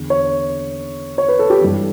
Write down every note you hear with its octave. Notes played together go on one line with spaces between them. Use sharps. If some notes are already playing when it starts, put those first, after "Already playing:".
Already playing: E2 D3
C#5
C#5
B4
A4
G4
G2 E3